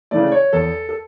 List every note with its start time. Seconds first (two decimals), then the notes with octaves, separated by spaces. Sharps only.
0.11 C#3 E3 A3 D5
0.32 C#5
0.53 E2 A4
0.89 A4